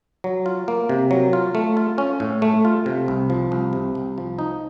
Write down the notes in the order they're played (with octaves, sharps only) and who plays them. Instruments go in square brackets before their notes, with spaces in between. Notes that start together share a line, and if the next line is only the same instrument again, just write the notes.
[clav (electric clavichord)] F#3
F4
A#3
C3
F#3
F4
A3
F4
C#4
A2
A3
F4
C3
C2
F3
C2
C3
C2
F3
D#4